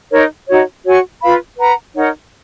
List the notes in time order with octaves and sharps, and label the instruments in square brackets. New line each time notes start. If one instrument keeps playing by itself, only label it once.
[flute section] D#4 A#4 C#5
D#4 F#4 C#5
F#4 C#5 G#5 C#6
F4 B4 F5 B5
B4 F#5 A#5
D#4 A#4 C#5 F#5